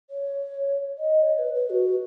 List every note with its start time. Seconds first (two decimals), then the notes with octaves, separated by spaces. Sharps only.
0.10 C#5
0.98 D#5
1.22 C#5
1.38 B4
1.54 B4
1.69 F#4